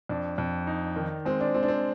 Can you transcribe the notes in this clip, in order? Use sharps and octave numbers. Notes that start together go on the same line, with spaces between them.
F2 D4
F2
D#4
D#3
G#3 C4
D4
G#3 C4
D4
C4